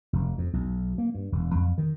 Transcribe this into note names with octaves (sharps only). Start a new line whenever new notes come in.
F1
F2
B1
A#3
G2
E1
F2
D#3